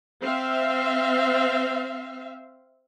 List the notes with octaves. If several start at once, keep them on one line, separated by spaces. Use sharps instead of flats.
C4 E5 F5